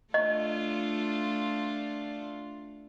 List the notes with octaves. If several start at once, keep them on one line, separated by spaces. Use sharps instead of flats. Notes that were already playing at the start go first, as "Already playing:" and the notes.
A3 D4 F4 D#5